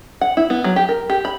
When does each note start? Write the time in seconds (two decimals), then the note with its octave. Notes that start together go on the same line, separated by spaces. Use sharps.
0.21 F#5
0.37 E4
0.50 B3
0.64 F#3
0.76 G4
0.89 A#4
1.10 G4
1.25 B5